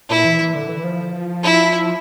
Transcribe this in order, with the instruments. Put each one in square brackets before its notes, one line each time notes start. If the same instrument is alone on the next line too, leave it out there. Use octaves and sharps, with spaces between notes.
[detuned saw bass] A#2 [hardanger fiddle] E4
[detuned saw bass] E3
E3
D3
E3
F3
[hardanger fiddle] E4